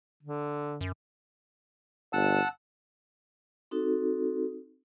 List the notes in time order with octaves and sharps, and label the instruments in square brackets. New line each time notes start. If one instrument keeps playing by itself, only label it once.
[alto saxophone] D3
[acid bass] F#2
[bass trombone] G1 [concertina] F#5 A5 E6
[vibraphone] C4 D#4 F#4 A4